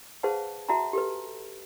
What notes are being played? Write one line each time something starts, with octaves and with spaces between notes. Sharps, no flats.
G#4 B4 C5 F5 F#5 A5
F#4 E5 F#5 A5 A#5
G4 A4 B4